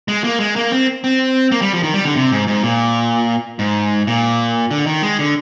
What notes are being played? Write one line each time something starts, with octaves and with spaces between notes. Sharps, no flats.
G#3
A#3
G#3
A#3
C4
C4
A#3
G3
F3
D#3
G3
D3
C3
G#2
G#2
A#2
G#2
A#2
D3
D#3
G#3
D3